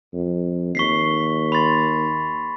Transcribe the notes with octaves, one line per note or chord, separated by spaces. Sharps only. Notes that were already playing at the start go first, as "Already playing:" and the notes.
F2
D#2 C#6 B6 C7
B5 C6 A6